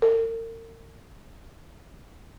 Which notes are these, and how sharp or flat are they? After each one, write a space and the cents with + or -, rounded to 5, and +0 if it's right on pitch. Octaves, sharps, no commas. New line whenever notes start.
A#4 -40